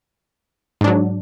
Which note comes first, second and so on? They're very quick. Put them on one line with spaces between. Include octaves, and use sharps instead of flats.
G#2 D4 F#3